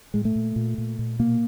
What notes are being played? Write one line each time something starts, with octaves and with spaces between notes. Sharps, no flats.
A2 G#3
A3
A#2
A#2
A#2
A#2
B2 A#3